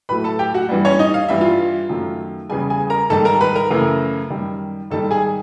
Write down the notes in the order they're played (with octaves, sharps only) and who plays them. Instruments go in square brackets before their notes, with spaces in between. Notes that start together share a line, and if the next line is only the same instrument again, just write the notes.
[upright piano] A2 F#3 A3 B4 B5
A4 A5
G4 G5
F#4 F#5
G2 E3 G3
C#4 C#5
D#4 D#5
F5
G2 E3 G3 E5
F4 F5
F#2 D#3 F#3 A3
E2 C#3 E3 G3 G#4 G#5
G#4 G#5
A#4 A#5
G#2 D#3 G3 A4 A5
A#4 A#5
B4 B5
A#4 A#5
F#2 C#3 E3 A3
F#2 D#3 G3
G#2 D#3 G3 A4 A5
G#4 G#5